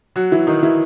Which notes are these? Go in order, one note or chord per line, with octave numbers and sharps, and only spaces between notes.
F#3 F#4
E3 E4
D#3 D#4
E3 E4